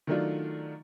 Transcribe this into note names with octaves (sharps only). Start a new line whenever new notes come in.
D#3 F#3 A3 D4 F4